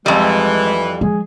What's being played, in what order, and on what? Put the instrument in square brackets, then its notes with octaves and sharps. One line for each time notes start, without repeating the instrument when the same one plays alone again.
[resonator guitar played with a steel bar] F2 G3 [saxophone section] E3 [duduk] G#3
[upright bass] F3 G#3 [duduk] G#4